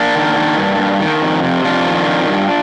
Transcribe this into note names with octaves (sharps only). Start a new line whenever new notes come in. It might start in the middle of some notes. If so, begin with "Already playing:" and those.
Already playing: A#3 D4
D#3
D#3
G2
G2
D#3
F2
C3
F2 D4 F4
D#3
F2
G2